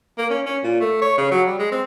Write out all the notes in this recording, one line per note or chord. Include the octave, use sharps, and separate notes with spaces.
A#3
C#4
C#4
A#2
A3
C#5
C#3
F#3
G3
G#3
C4